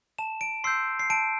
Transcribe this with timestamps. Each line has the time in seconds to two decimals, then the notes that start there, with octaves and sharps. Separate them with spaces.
0.18 A5 E7
0.41 D7
0.64 C6 E6 G6 C7
0.99 C7
1.10 A5 D7